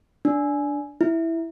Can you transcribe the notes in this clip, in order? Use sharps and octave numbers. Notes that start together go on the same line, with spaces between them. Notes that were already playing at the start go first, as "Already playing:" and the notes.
D4
E4